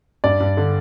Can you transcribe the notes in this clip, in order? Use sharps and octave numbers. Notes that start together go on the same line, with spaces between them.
G2 D5
G2
D3